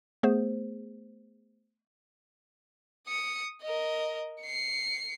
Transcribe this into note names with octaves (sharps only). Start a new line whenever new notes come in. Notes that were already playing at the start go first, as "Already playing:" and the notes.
A3 B3 G#4 C5
D#6 C#7
A#4 D#5
C7 C#7